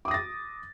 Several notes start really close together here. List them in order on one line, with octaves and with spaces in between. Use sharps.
D6 D#6 A#6 A6